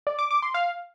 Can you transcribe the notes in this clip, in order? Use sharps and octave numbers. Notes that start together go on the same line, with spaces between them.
D5
D6
D6
C6
F5